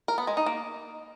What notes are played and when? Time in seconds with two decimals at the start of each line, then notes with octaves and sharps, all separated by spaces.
0.08 A#4
0.18 B3
0.27 G#3
0.37 D#4
0.46 A#3